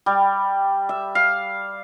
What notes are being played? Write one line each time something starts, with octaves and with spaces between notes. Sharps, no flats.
G3
E5
F5